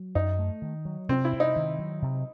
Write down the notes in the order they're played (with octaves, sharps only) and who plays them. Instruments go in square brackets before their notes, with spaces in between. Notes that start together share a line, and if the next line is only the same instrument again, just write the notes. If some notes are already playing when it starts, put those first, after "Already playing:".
Already playing: [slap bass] F#3
[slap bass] F#2 [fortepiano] D#4
[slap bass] A3
D#3
F#3
[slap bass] C3 [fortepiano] C4
[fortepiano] E4
[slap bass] C3
[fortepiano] D#4
[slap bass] D#3
F#3
C3